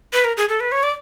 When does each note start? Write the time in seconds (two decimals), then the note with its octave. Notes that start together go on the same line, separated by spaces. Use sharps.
0.13 B4
0.24 A#4
0.37 G#4
0.49 A4
0.60 B4
0.72 C#5
0.83 D5